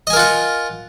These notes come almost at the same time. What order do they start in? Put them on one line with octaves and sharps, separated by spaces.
D#5 G#5 A#4 F4 F#5